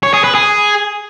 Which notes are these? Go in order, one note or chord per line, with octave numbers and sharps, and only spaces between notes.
C#5
G#4
B4
G#4